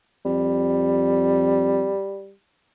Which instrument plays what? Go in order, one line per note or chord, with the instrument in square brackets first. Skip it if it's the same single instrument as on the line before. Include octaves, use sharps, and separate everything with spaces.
[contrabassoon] F2 [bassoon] G3